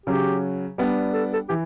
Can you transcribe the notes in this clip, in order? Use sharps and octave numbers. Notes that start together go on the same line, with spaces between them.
C#3 F#3 C#4 G4
G3 B3 D4
A4
A4
E3 G4